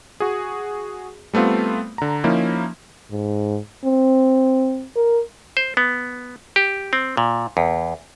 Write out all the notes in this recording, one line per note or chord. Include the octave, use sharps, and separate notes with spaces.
F#4 G#4
G3 A3 B3 C4 F4
D3 A#5
F3 A#3 C#4 D#4 E4
G#2
C4
A#4
C5
B3
G4
C4
A#2
E2